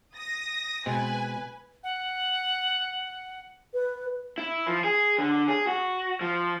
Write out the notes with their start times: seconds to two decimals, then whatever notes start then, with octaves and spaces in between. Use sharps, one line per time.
0.16 D#6 A#6
0.86 B2 G#3 C4 B4 G#5
1.83 F#5
3.74 B4
4.38 E4
4.67 F3
4.84 G#4
5.19 D3
5.48 G#4
5.67 F#4
6.21 F3